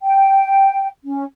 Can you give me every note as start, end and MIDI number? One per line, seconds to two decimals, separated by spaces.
0.01 0.88 79
1.05 1.24 61